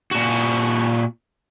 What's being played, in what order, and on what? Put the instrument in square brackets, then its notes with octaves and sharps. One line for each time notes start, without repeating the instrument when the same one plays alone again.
[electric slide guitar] A#2 F#4